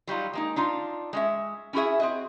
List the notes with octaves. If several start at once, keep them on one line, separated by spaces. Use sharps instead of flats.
F#3 G3 D#4 F4
G#3 A#3 D#4
D4 D#4 F4
G#3 C#4 E5
C#4 E4 F#4 G#4 E5
C4 F#4 D#5